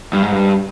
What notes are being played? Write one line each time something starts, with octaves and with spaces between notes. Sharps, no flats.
G2
G#2
G2